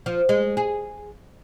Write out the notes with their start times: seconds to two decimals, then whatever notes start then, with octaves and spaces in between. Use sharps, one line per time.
0.06 F3
0.29 G#3
0.57 G#4